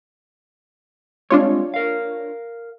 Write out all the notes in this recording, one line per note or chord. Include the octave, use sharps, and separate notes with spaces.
G3 G#3 C4 D4 F4 C#5
A#4 F5